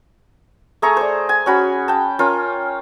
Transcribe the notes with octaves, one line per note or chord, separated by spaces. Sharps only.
A3 G#4 A#5 C#6
C5 D5
G#5
C#4 F#4 B5
G5 A5
C#4 F4 A#4